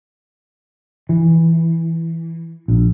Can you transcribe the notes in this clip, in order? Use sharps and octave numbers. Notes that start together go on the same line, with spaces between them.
E3
A#1